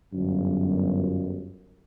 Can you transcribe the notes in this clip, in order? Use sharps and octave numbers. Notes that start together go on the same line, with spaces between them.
G1 F#2